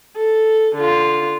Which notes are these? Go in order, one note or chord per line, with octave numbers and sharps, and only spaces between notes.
A4
D3 F4